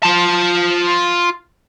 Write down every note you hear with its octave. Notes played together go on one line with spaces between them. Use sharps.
F4 A5